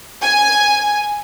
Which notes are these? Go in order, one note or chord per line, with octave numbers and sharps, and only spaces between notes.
G#5